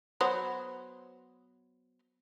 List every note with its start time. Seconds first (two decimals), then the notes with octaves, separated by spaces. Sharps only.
0.21 F#3 B3 C5